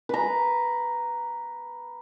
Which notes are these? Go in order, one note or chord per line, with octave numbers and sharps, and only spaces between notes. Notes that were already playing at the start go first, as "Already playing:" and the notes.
B4 A#5